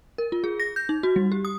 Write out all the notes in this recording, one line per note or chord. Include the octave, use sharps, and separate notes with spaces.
A#4
F4
G#4
A#6
G6
D#4
F#4
G3
G4
D#6